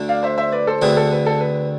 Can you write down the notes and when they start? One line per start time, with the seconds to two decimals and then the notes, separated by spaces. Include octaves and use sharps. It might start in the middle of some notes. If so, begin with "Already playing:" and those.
Already playing: D2 D3 A3 D4
0.09 D5 F5
0.23 C5 E5
0.38 C5 E5
0.52 B4 D5
0.67 A4 C5
0.82 D2 D3 A3 C4 G#4 B4
0.97 A4
1.12 B4
1.26 A4
1.40 B4